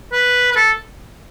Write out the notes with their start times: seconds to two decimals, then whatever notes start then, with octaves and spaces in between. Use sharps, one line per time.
0.12 B4
0.52 B4
0.56 A4